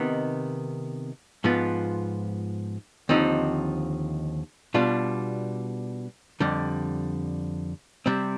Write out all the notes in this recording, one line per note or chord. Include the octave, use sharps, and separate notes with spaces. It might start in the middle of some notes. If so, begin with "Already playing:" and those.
Already playing: C3 D#3 B3 D#4
G#2 F3 B3 F4
D#2 D3 F3 C4 D#4
B2 G3 D4 F4
F2 D3 G3
C3 G3 C4